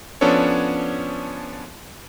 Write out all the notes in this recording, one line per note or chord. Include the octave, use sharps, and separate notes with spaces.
F3 B3 C#4 D4 A4 C#5